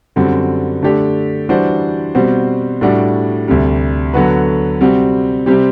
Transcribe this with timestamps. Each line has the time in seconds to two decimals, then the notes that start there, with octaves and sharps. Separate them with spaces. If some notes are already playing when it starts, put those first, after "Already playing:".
0.16 F#2 D3 G3 C4 F#4
0.82 D3 A3 D4 G4
1.49 E3 G3 D4 F#4 C5
2.15 B2 G3 C4 F#4 C5
2.81 A2 G3 D4 F#4
3.48 D2 C3 G3
4.14 D3 F#3 B3 F#4 B4
4.81 C3 G3 C4 F#4
5.46 C3 G3 C4 G4